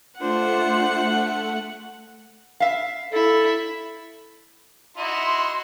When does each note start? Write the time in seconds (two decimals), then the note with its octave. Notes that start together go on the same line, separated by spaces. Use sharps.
0.20 A3 D4 F4 C5 F#5
2.60 E5 F5
3.13 E4 A4
4.98 D#4 E4 F#4 C6